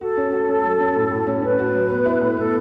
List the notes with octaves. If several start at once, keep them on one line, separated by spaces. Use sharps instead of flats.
F#4 A4
C#4
F#4
C#4
F#3
C#4
A2
A2
C#4
C#4 B4
F#4
F#3
B3
E4
A2
B3 A4